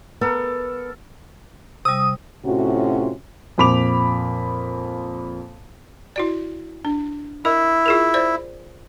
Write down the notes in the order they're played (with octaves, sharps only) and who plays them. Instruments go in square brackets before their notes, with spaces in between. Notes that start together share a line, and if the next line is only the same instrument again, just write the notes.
[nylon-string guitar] B3 [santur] A4 A#4
[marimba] C3 G3 [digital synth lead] D#6
[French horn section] A2 C3 C#4 F4 F#4
[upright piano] F2 A#2 B5 D6 F7
[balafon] E4 F#4 D5
D4
[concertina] E4 [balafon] A#4 D#5
[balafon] F4 G#4 A#4
C5 D5